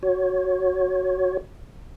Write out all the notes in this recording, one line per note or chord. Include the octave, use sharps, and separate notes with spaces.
F#4 C#5